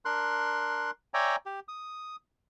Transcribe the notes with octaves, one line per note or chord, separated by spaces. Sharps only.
D4 A#4 C6 F#6
C#5 D5 E5 G5 G#5 A#5
G4
D#6